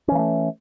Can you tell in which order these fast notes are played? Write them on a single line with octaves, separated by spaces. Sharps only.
C#4 E3 A#3 A3